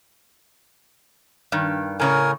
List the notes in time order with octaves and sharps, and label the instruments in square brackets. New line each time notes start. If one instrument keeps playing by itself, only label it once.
[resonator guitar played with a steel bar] G2 D#3
[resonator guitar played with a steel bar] A2 C#3 C#5 [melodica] A#4 G#5